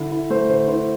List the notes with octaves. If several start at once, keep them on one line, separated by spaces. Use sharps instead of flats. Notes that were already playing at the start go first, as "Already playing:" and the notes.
Already playing: D3 E4
E4
A3 C5
D3 C5
E4 C5